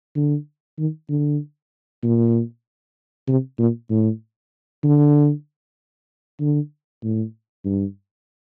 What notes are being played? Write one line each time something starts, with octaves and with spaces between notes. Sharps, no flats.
D3
D#3
D3
A#2
C3
A#2
A2
D3
D3
A2
G2